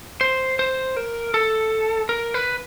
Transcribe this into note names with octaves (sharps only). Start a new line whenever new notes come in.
C5
C5
A#4
A4
A#4
B4